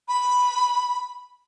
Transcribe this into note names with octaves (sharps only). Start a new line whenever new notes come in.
B5